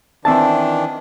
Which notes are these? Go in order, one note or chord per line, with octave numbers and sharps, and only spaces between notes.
D#3 E3 C4 D4 E5 A5